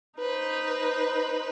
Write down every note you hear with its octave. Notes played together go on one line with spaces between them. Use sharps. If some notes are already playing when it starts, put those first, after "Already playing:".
D#4 B4 C5